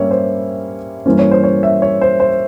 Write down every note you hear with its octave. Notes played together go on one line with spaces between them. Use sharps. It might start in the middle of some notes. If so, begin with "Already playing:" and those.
Already playing: G2 G3 A#3 C#4 C#5 E5
C5
G2 E3 A#3 C#4 C5
C#5
C5
C#5
E5
C#5
C5
C5